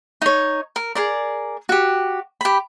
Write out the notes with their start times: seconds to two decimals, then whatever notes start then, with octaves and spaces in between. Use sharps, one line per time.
0.22 D#4 C#5
0.76 A#4
0.95 G#4 A#4 D5
1.69 F#4 G4
2.41 G4 B5